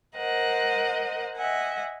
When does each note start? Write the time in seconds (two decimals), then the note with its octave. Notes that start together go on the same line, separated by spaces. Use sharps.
0.17 A#4 C5 D#5 F#5
1.37 D#5 E5 F#5 G#5